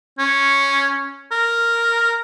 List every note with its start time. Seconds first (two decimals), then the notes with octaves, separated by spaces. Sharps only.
0.19 C#4
1.32 A#4